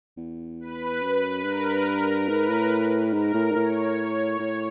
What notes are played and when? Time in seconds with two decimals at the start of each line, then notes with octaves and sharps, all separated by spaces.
0.17 E2
0.60 B4
1.02 F#2
1.44 G2 A#4
2.28 G#2 B4
2.49 A2
3.13 G#2 A#4
3.34 A2
3.51 G#2
3.55 A2 C#5
4.39 A2